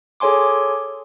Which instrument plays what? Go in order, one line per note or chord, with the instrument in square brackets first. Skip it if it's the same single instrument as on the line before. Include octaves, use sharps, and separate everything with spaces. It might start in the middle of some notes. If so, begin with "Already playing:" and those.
[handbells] G#4 A4 C#5 G#5 C6 D6